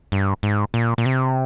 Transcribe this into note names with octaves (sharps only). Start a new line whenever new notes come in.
G2
G#2
A#2
A#2
C3